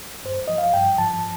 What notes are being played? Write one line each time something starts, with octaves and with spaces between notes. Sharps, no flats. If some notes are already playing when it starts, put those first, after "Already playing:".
G2 C5
F3 D#5
F5
G2 G5
F3 A5